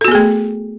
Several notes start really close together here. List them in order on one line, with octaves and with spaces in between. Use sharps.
A4 F#4 B3 G#4 A3